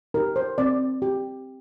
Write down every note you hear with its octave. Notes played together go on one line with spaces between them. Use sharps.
D#4 G4 A#4
C5
C4 D5
G4